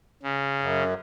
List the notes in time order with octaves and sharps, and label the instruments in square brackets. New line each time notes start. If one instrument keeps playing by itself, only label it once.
[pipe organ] C#3
[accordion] F#2